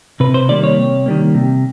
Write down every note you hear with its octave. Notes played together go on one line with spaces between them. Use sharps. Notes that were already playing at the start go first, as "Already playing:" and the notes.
C3 B4
C5
D#3 G3 A#3 D5
C#5
C3
D#3 G3 A#3
C3